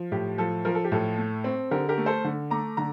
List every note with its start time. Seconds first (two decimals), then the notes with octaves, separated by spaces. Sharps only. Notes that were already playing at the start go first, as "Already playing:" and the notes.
Already playing: F3
0.12 A2 G4
0.38 F3 A4
0.65 F3 A#4
0.75 A4
0.84 G4
0.92 A2 A4
1.18 A3
1.44 C4
1.71 D3 G4 A#4
1.89 G4 A#4
1.98 A3
2.06 A4 C5
2.24 D3
2.51 A3 A#5 D6
2.77 D3 A#5